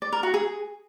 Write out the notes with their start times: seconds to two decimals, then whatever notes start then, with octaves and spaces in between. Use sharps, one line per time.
0.02 D5
0.12 A#4
0.23 F#4
0.34 G#4